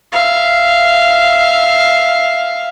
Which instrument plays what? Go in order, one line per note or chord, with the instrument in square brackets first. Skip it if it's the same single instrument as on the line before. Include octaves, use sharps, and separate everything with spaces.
[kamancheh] E5 F5